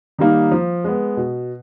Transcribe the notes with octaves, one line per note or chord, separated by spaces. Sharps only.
D#3 G3 A#3 D#4
F3
G#3 B3
B2